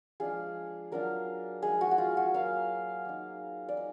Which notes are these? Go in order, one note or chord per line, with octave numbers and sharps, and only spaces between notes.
F3 G#3 D4 F4 G#4
F#3 D4 F4 A#4
F3 G#3 D#4 G#4
F#4
F#4
F4
F#4
F#3 A#3 F4 F5
A#3 D#4
D5
D#4